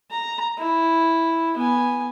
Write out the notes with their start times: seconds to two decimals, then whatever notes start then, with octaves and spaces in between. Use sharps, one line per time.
0.10 A#5
0.58 E4
1.57 B3 G#5